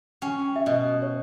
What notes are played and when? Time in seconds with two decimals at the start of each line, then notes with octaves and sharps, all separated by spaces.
0.22 C#4 G5
0.56 E5
0.66 B2 D#5
1.02 C#5